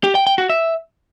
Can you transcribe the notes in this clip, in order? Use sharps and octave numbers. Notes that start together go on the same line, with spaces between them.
G4
G5
G5
F#4
E5